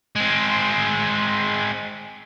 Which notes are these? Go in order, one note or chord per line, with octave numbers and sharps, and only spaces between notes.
G#3 C4